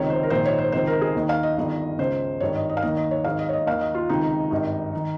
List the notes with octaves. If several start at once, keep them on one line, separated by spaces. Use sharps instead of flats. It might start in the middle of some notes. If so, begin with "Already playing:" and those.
Already playing: C#2 C3 D#3 C#5
C5
A#4
A#1 G#2 D#3 C5
C#5
C5
C#2 C3 D#3 C5
A#4
G#4
D#2 D#3
F5
D#5
G1 G2 D#3
C#2 C#3 C5
G#1 G2 D#3 C#5
D#5
D#5
F5
D#2 D#3 D#5
D#5
C#5
G#1 G#2 D#3 F5
D#5
C#5
D#5
D#2 D#3 F5
D#5
F4
C#2 C3 D#3 D#4
G#1 G2 D#3
D#3